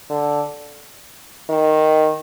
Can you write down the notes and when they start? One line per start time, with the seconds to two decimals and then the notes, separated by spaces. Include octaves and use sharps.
0.10 D3
1.49 D#3